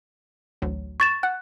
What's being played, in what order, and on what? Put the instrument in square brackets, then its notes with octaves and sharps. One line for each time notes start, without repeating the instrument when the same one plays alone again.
[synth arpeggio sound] A1 D2 F#3
[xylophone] C#6 A6 E7
[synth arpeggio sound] F#5 [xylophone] F#6